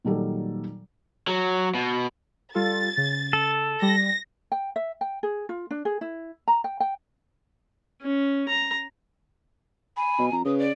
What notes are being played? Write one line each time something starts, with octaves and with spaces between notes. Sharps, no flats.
A#2 D#3 F#3 G3 A4
F#3
B2
G3 F4 A4 A6
C#3
A4
G3 A#6
G5
E5
G5
G#4
F4
D4
G#4
E4
A#5
G5
G5
C#4
A#5
G#5 B5
B2
F2 A#5
C#3 B4 D#6
D5